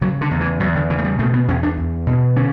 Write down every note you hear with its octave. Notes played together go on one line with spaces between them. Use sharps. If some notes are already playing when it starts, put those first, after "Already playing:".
C#3 F#3
D3
E2
E3
E2 F#3
D3
C#3 E3
A3
G3
B2 A3
B3
E2 C#4
D4
E2
B2
D3 C#4